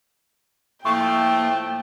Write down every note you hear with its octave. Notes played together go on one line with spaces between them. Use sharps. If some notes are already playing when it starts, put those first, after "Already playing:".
A2 F3 A3 A#3 G5 C#6